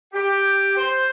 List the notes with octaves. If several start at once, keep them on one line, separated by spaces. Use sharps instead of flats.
G4
C5